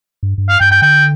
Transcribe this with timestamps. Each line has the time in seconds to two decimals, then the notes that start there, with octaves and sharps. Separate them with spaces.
0.23 G2
0.38 G2
0.49 F5
0.60 G2 G5
0.71 G5
0.82 D3 G5